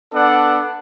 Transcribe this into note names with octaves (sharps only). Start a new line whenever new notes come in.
B3 D4 A4 D5 F#5